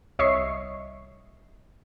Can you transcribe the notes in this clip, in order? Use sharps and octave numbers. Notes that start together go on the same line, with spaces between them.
C2 C#5 D#5 E5 C#6 C7